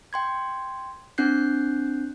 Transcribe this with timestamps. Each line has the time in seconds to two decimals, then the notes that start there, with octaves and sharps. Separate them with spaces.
0.13 G5 C6 G#6
1.18 C4 D4 F#6 G6 C7